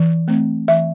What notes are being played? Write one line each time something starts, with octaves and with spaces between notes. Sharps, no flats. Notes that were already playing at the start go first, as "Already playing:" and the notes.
Already playing: E3
A3 C4
E3 E5